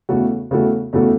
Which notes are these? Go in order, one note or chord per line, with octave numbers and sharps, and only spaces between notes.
E2 C#3 A3 F#4 A4
E2 C#3 A3 F#4 A4
E2 C#3 A3 F#4 A4